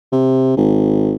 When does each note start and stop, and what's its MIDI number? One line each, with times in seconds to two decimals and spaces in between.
0.12 0.54 48
0.57 1.15 32